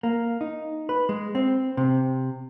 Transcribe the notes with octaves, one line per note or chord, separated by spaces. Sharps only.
A#3
D#4
B4
G#3
C4
C3